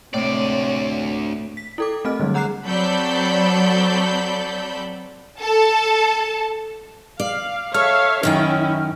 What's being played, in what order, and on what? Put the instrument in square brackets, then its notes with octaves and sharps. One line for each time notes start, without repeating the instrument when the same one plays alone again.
[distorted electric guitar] D2 D5 [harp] A2 [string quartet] C3 G#3 C#5
[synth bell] B6
E4 A4 D6
A3 C4 D#5 F6
D3 E3 F#3 G3
G#4 F#5 A#5 D6 F#6 C7
[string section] F#3 C4 A4 D5 B5 G6
A4 A5
[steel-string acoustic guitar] D5 [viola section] F5
[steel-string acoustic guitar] A4 [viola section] C#5 E5 F5 [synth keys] F6
[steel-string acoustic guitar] F#2 D#3 G5 [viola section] C#4 E4